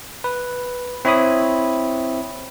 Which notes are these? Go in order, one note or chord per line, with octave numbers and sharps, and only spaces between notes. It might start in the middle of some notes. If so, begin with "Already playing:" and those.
B4
C4 E4 C#5 B5 D#6